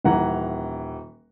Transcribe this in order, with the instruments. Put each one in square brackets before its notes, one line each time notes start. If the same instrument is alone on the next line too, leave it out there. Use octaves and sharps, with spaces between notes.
[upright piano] D#1 E3 F#5 A#5